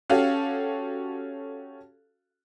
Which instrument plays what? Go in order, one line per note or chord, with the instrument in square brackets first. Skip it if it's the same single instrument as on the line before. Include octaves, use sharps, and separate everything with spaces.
[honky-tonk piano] C#4 F#4 G4 A4 F5